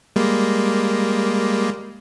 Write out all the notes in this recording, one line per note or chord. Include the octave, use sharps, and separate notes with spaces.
G3 G#3 A#3